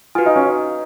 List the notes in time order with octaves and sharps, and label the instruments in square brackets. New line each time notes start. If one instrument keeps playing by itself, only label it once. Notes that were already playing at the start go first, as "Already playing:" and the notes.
[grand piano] F4 [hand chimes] F#4 B4 F5 G#5
[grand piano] D#4
C#4
D#4